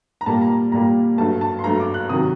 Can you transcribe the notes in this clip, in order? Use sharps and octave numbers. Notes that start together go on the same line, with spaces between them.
A#5
A#2 G3 A#3 A5
A#5
A#2 G3 A#3 A#5
G2 F#3 A3 A5
A5
C6
G2 F#3 A3 A#5
D6
F#6
C3 D#3 F#3 D#6